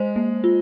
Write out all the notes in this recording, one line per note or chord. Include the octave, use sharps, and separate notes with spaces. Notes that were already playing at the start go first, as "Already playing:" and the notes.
Already playing: G#3 C5
A#3
F4